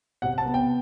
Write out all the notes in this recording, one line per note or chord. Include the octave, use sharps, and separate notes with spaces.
C3 F#5
A5
B3
G5